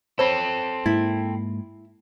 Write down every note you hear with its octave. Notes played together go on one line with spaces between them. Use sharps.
C4 A4 C5 C#5 B5
G#2 A#3 E4 A6